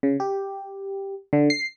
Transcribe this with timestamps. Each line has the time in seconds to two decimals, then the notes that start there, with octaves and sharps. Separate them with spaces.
0.03 C#3
0.20 G4
1.33 D3
1.50 C7